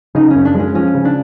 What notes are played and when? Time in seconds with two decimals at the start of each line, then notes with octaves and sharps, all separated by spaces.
0.15 C#3 D#4
0.30 F#2 C#4
0.45 D4
0.55 G#3
0.60 C#4
0.75 F3 C#4
0.95 C#3
1.05 D4